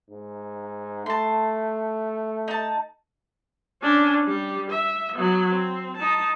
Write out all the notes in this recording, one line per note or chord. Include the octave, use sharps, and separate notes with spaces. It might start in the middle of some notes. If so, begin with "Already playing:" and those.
G#2
A3 A5 C6
D#4 A5
C#4 D4
G3 G4
E5
F#3 B3
C4
D#4 A5